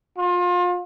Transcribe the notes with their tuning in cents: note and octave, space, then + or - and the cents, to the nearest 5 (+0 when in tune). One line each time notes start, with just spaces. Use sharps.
F4 +30